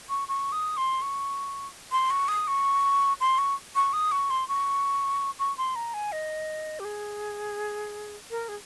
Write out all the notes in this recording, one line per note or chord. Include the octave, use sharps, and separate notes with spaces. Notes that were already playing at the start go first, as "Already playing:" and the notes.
C#6
C#6
D#6
C6
C#6
C6
C#6
D#6
C#6
C6
C#6
C#6
D#6
C#6
C6
C#6
C#6
C6
A#5
G#5
D#5
G4
G#4
A#4
G#4